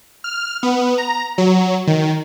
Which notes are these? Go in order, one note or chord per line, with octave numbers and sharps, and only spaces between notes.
F6
B3
A#5
F#3
D#3